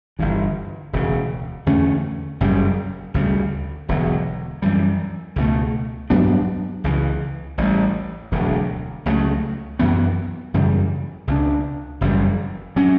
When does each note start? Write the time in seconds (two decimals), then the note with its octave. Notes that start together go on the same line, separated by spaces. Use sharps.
0.19 G1 G2 E3
0.93 E1 D2 C#3
1.66 E2 D3 A3 C#4
2.41 F#1 F#2 C#3 G3
3.14 D2 C#3 E3 G3
3.88 E1 E2 D3 F#3
4.62 F#2 E3 G3
5.36 C#2 B2 A3
6.10 G2 F#3 B3 D4
6.84 C#2 C#3 E3
7.58 A1 A2 G3
8.32 E1 D2 D3 F#3
9.06 C#2 C#3 F#3 A3
9.79 F#2 E3 B3
10.54 F#2 C#3 E3 G3
11.27 C#2 C#3 G3 D4
12.01 F#1 F#2 E3 G3
12.76 F#3 C#4